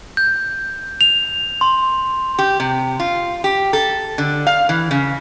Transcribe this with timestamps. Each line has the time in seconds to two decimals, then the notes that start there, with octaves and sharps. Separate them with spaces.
0.17 G6
1.01 F7
1.61 C6
2.39 G4
2.60 C3
3.00 F4
3.44 G4
3.73 A4
4.18 D3
4.47 F5
4.69 E3
4.91 C#3